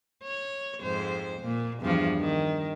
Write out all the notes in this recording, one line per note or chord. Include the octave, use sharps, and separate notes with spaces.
C#5
F2 G#2 C5
A#2
E2 G2 F3
D#3